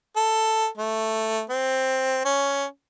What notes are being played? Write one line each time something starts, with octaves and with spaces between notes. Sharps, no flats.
A4
A3
C4
C#4